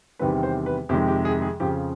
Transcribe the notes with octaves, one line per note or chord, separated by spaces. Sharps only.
E2 C3 D#3 G3 C4 B4
C5
B4
F2 C3 D#3 G#3 G4
G4
G#4
G#4
F2 C#3 F3 G4